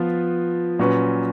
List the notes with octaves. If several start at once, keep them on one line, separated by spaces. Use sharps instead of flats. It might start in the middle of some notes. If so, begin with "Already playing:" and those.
Already playing: F3 B3 F4 B4
A#2 F#3 C#4 F#4 B4